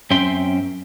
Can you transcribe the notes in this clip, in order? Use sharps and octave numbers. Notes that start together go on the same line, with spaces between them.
F#2 C4 C#4 E5 G5 C6